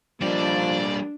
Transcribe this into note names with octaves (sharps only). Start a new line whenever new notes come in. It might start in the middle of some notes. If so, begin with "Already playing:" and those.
F3 G3 A#3 D4 D5